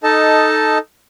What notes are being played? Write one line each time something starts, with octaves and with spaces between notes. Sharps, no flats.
D#4 A4 D#5 A5